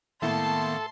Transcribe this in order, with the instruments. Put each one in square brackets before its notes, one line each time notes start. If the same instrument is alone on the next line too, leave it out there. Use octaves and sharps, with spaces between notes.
[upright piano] A2 [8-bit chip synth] D#3 A#3 B3 [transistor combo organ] A4 [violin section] A5 C6